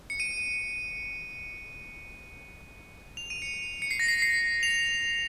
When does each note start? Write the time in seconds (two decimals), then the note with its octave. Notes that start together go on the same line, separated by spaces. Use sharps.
0.10 C#7
0.20 D#7
3.17 F7
3.30 D#7
3.42 C#7
3.82 C#7
3.91 C7
4.00 A#6
4.08 C7
4.22 C7
4.63 F7